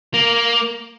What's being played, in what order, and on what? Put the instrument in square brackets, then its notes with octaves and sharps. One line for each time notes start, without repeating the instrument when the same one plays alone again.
[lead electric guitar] A#3